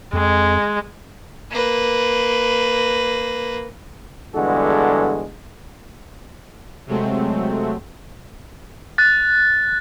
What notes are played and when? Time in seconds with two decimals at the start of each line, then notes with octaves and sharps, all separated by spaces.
0.13 F2 G#3
1.51 A#3 B4
4.34 E2 G2 D3 G#3 F#4 A4
6.87 C3 F#3 G#3 A3 C4
8.98 F#6 A6